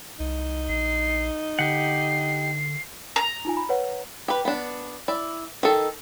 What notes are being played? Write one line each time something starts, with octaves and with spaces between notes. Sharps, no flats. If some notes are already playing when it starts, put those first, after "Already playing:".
C2 D#4
A#1 C7
D3 G4 F#5 C7
A#5
D#4 F4 G#5
B5
B4 C#5 F#5
G4 B4
B3 D4
E4 D5
D#3 A4